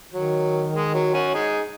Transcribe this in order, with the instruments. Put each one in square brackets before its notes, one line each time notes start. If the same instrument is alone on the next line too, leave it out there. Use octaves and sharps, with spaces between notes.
[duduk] D#3 [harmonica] F#3
[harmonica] G#3
F#3
C#4 F#4
D#4 G#4